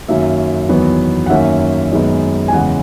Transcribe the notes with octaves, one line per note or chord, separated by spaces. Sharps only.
F#2 D#3 F#3 A#3 E5
E2 D#3 F#3 B3
F#5
F#2 D#3 A#3 C#4 E5
F#2 D#3 G#3 B3 D#4
G#5
E2 C#3 G#3 F#5